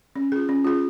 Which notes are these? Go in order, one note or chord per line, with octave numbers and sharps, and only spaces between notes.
C#4
F4 G#4
C#4
F4 G#4